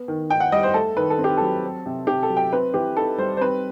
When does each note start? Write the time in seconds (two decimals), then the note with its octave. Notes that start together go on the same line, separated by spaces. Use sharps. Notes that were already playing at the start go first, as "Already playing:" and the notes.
Already playing: B3
0.08 D#3
0.30 D#4 G5
0.40 F#5
0.52 G3 D#5
0.63 C5
0.74 A3 A4
0.97 D#3 B4
1.10 A4
1.18 C4
1.24 G4
1.37 F#3 A4
1.63 C4
1.86 C3
2.07 C3 G4
2.23 A4
2.30 F#3
2.37 G5
2.53 C4 B4
2.74 E3 G4
2.97 D#4 A4
3.18 G3 C5
3.37 C5
3.41 C4 B4